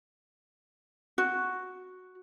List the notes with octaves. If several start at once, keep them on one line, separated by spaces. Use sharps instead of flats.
F#4